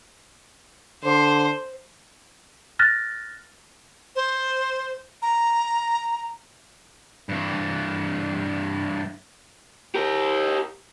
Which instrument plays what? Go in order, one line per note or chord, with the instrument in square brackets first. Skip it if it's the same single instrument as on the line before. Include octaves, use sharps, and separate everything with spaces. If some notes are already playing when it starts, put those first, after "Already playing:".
[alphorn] D3 [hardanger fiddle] C5
[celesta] F6 F#6 A6 A#6
[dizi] C5
A#5
[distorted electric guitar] G2 E3
[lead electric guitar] G4 A#4